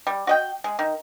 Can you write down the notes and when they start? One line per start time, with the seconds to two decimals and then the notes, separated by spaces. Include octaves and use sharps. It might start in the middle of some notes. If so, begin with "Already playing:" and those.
0.07 G3
0.27 F#4 D#5 G5
0.64 G#3
0.79 D#3